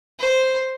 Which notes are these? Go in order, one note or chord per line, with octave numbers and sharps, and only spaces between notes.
C5